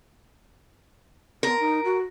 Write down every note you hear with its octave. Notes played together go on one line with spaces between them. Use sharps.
B3 A#4
D#4
F#4